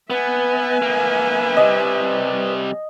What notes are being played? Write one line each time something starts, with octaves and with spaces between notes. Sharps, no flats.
B3 B4 E5 G#5
A#3 B3
C3 G3 D#5